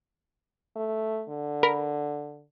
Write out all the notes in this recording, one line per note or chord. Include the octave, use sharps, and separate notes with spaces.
A3
D3
A#4 B5